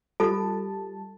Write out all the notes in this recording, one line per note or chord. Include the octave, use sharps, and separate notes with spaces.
G3 F4 A4 A5